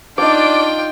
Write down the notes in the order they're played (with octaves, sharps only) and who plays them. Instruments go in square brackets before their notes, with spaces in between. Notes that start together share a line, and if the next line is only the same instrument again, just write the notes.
[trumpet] D4 [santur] D#4 C#5 [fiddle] F4 G5 [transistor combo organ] D5 D6